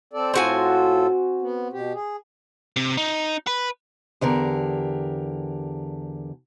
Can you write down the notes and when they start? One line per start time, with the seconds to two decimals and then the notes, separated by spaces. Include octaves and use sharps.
0.13 C4 A4 D5
0.34 A2 C4 F4 F#4 A4 G#5
1.42 B3
1.73 B2 G4
1.94 G#4
2.76 C3
2.97 D#4
3.47 B4
4.21 E2 D3 G4 A#4